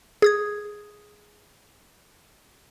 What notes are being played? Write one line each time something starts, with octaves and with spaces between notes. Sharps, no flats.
G#4 D#6 G#6